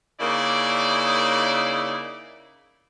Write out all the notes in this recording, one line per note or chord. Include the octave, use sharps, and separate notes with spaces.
C#3 A#3 D#4 E4 D5